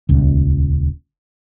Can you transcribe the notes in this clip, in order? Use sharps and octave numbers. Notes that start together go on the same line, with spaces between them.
D#1 C#2